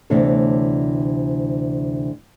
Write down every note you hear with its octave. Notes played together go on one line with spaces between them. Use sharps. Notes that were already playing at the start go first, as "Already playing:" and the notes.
D2 C3 E3 B3 D4 C#5